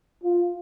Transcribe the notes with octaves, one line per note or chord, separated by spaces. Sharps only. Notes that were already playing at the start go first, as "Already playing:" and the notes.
F4